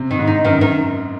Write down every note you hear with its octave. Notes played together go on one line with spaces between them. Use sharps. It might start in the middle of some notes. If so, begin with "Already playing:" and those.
Already playing: C3
D#3
G#2
D#4
F#2 D#3
D#3